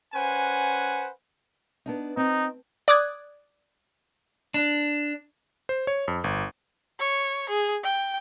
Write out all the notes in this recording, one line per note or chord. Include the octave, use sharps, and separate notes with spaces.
C#4 B4 C5 F#5 G#5
B3 D4 D#4
C4 D#4
D5 D6 D#6 F#6 G#6
D4
C5
C#5
F2
G1
C#5
G#4
G5